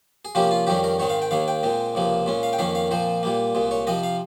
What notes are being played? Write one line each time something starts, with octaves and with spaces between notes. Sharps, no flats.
G#4
C3 F3 A#3 C#4 G4
F4
F2 D#3 G3 C#4 G4
A#4
G#2 D#3 G#3 C4 C#5
F5
G5
D#2 D#3 A#3 F5
G5
A#2 G#3 C4
C#2 C3 F3 A#3
A#2 G#3 C#4
F5
G5
F2 D#3 A#3 C#4 F5
F5
A#2 F3 C4 C5
A#2 G3 A#3
C2 A#2 G#3
C#5
C3 F3 C4 D#5
F5